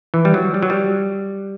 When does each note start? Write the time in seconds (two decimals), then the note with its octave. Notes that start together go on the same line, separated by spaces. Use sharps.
0.14 E3
0.25 G3
0.34 F#3
0.54 G3
0.62 F#3
0.70 G3